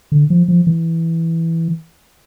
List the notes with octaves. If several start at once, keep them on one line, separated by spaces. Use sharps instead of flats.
D3
F3
F3
E3